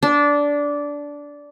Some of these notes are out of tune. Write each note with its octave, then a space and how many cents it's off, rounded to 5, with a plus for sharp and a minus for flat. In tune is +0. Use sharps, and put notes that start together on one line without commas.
D4 -15